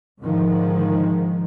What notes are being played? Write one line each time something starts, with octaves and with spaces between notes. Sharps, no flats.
G#2 D3 D#3 F3 G#3